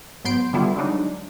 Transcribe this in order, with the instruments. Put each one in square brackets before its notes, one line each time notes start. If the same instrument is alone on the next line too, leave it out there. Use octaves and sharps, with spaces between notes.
[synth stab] G#2 F#3 B3 C6 G6 D7
D3 G3 B3 D4 E4 F4
D3 F#3 G#3 D4 D#4